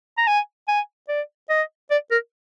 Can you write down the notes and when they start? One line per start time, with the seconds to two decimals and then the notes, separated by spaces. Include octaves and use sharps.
0.18 A#5
0.27 G#5
0.68 G#5
1.09 D5
1.50 D#5
1.91 D5
2.11 A#4